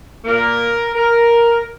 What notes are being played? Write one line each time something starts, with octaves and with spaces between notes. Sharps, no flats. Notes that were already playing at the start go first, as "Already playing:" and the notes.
A#2 A#3 A#4
A#4